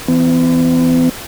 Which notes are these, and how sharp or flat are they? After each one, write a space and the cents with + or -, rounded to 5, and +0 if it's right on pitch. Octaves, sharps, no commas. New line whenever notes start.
E3 +0 B3 +45